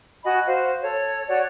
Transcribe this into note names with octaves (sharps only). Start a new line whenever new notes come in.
F#4 D#5 G#5 B5
F#4 C5 F5
A4 C#5
F#4 C#5 D5